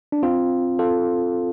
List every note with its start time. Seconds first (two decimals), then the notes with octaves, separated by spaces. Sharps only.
0.12 D4
0.23 C4 F4
0.79 F4 A4